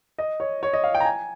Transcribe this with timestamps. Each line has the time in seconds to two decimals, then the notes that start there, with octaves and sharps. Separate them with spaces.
0.18 D#5
0.40 C#5
0.63 C#5
0.73 D#5
0.84 F5
0.95 G5
1.00 A#5
1.05 G#5